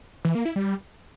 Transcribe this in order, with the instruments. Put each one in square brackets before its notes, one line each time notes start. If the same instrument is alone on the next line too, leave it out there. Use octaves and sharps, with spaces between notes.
[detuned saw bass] E3
A#3
E4
G3